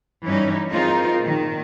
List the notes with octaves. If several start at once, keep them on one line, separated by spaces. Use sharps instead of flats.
G2 E3 G3 C#4 D#4
E3 C4 D#4 F4 G#4 A#4
A#2 D#3